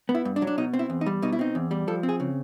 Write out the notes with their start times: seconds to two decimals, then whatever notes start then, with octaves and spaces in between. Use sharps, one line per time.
0.09 B3
0.15 E4
0.25 G2
0.36 D4
0.42 F#3
0.47 D4
0.58 B2 D#4
0.74 C4
0.79 E4
0.90 E2
1.01 D#4
1.06 G3
1.22 B2 D#4
1.32 E4
1.39 C4 D#4
1.55 E2
1.71 G3
1.88 F3 A4
2.03 C4
2.09 G#4
2.20 C#3